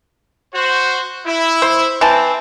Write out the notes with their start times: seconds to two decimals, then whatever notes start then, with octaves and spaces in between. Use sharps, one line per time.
0.55 F#4 C5
1.27 E4
1.62 C5
2.01 E3 C4 A5